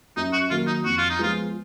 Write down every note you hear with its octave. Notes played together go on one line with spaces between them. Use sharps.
F#2 D#4
F#4
D#3 F#3 A#3 F4
D#4
F2 F#4
F4
D#4
F3 G#3 B3 F4